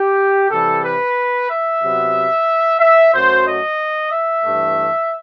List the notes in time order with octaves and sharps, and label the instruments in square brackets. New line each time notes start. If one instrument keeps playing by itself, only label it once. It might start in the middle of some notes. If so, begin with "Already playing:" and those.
Already playing: [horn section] G4
C3 E3 G3 A4
B4
E5
C3 F#3 B3
E5
F#2 F#3 A3 C5
D#5
E5
G2 E3 A3